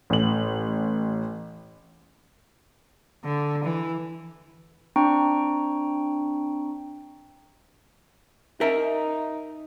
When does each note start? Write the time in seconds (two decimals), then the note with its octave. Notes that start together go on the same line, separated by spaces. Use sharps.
0.10 A1 F#7
3.25 D3
3.64 E3
4.96 C4 D4 G5 A#5 C#6
8.61 D#4 A#4 E5